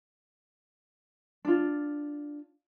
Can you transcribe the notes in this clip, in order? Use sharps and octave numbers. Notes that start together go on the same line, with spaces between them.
D4 F4